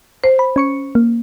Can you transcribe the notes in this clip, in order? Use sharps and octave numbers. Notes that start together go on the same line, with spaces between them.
C5
B5
C#4 C#6 C#7
A#3